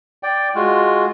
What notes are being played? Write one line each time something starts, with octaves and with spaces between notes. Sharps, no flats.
D5 G5
G#3 F4 F#4